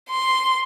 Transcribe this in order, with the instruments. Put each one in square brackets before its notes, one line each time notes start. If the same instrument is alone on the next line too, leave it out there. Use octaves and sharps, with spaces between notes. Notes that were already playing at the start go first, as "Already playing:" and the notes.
[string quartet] C6